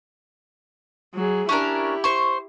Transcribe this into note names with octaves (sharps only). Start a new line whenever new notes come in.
F#3 G#4
C#4 D4 E4 G4 A#4
C5 C#6